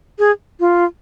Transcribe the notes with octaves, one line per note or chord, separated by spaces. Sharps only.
G#4
F4